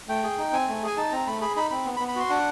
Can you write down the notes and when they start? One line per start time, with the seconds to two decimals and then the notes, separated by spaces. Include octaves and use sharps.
0.09 A3 G5
0.24 G#4
0.38 D#4
0.53 C4 G#5
0.68 A3
0.83 G#4 G#5
0.97 D#4 A5
1.11 C4 A#5
1.27 A3 B5
1.41 G#4 B5
1.56 D#4 B5
1.71 C4 B5
1.85 B3
1.96 B5
2.00 B3
2.08 B5
2.16 F#4 C6
2.30 D4 F#5